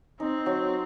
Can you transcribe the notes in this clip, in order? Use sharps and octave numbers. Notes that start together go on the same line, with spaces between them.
C4 D#4
F#3